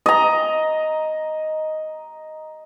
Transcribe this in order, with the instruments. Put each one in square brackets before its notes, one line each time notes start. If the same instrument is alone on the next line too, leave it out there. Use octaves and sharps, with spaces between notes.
[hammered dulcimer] D#5 A#5